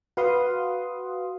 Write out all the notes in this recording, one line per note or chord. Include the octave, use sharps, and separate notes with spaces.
F#4 B4 F5 F#5 C6 D#6